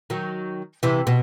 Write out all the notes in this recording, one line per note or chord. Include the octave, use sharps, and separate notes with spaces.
D#3 F#3
C3 E3
B2